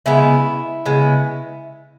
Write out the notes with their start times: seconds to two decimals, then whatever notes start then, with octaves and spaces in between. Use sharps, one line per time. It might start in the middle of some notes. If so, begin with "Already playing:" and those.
0.06 C#3 G#3 B3 E4
0.85 C#3 G#3 B3